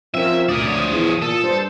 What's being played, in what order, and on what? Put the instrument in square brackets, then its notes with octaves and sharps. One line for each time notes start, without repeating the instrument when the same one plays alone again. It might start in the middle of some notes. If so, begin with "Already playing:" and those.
[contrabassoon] F3 [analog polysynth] C4 C#4 A#4 [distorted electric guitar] E5
[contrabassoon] D2 [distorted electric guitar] A#4 D5 [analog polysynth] D#6
[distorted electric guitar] F3 C#5
[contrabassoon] E2
[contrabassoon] A#2 [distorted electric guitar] A4
[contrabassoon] G2 [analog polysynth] C5